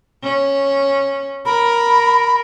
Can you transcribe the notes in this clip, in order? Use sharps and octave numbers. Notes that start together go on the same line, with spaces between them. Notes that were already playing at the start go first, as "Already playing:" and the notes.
C#4
A#4 B5